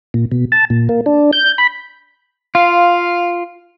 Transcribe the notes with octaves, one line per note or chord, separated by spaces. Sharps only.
A#2
B2
A5
A#2
A#3
D4
G6
B5
F4 F5